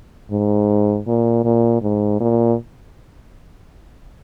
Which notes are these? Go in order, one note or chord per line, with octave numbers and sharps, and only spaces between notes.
G#2
A#2
A#2
G#2
A#2